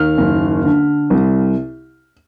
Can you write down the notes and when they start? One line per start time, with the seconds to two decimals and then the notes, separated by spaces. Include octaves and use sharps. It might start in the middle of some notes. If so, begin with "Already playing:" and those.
Already playing: D#2 F6
0.18 F#1
0.64 D3
1.10 C2